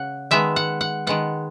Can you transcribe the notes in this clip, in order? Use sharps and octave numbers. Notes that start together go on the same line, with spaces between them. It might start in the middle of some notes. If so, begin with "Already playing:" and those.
Already playing: C#3 F#5
D#3 G#3 B3 E5
F#5
F#5
D#3 G#3 B3 F#5